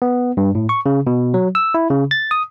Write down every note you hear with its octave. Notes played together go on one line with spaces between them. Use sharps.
B3
G2
A2
C#6
C#3
B2
F#3
E6
E4
C#3
A6
D#6